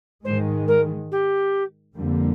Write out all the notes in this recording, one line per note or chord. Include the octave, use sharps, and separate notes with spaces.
G#2 D#3 G#3 C5
A#4
G4
F2 D3 G3 A#3